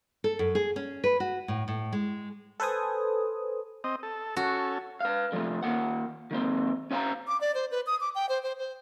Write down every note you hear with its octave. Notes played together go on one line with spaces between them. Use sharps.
A4
F#2
G#4
C#4
B4
F#4
A2
A2
G#3
A4 B4 C5 G#5 D#6
C4 D#5
A4
C#4 F#4 A4
B4 F5
D3 F3 G#3 A3
D#2 A#3 F#5
D#3 A#3 C4
C#4 C#5 F5 A5 A#5
D6
D5
C5
B4
D#6
D6
G5
C5
C5
C5